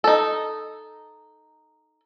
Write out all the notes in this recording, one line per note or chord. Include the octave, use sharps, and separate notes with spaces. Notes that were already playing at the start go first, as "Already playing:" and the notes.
D#4 A4